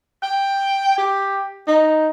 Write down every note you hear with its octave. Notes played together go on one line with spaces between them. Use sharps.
G5
G4
D#4